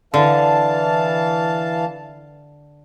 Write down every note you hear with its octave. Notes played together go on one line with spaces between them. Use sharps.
D3 E3 F5 A5